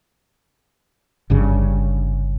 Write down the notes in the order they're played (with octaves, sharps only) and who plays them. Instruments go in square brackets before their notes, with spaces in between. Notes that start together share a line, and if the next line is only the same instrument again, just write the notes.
[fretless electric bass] G1 G2 C#3